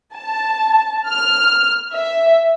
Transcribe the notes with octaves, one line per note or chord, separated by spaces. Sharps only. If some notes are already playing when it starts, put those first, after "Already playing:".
A5
F6
E5